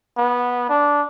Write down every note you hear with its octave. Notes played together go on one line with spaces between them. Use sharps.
B3
D4